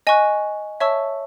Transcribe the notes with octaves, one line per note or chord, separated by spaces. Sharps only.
D#5 G#5 C#6 F#6
C#5 E5 A5 C#6 E6